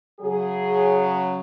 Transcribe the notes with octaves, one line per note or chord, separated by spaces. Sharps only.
C#3 F#3 G#4